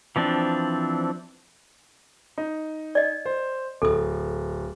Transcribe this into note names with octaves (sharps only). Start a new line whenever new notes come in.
E3 F3 C4 D4
D#4
D5 D#5
C5
D1 A4 D#6